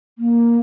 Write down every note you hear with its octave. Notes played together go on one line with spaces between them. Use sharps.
A#3